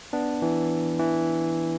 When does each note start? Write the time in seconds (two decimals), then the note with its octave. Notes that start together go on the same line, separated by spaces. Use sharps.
0.13 B3 D4
0.42 E3
0.99 E3